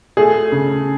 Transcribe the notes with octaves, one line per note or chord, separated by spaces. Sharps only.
A3 G#4
C#3